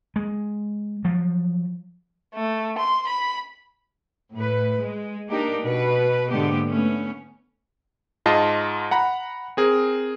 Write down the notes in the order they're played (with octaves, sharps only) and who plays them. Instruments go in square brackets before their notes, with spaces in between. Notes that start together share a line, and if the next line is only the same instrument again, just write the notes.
[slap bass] G#3
F3 F#3
[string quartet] A3
C6
B5
[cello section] A2 B4
G#3
A#3 D4 D#4 G4 A#4
B2 B4
G#2 D3 G#3 A#3 B3 G4
A3 B3 C#4
[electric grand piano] G#2 F4 D#5 A5 C6
F#5 A#5 B5
C4 G#4 A#4